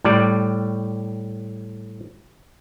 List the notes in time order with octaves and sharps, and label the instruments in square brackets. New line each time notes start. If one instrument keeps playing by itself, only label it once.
[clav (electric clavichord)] A2 G3 D5